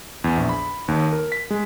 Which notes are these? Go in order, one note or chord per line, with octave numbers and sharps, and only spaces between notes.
E2
A#1
B5
D#2
A#4
B6
G#3